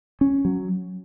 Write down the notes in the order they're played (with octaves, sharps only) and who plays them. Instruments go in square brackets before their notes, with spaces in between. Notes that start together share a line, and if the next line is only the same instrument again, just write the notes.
[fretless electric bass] C#4
F#3